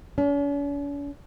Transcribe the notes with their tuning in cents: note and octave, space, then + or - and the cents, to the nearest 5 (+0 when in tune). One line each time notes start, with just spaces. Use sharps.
C#4 +45